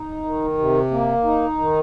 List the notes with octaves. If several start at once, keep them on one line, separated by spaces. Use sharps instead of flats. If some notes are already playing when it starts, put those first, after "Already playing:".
Already playing: D#4
D#3
C3
A#3
D#4
D#3